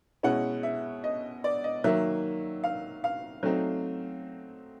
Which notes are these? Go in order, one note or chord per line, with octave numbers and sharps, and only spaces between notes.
B2 G#3 C#4 E4 F#5
E5
D#5
D5
D#5
D#3 F#3 A#3 E5
F5
F5
F#3 A3 C4 D#4